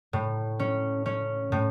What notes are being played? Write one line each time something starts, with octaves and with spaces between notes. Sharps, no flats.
A2
C#4
C#4
A2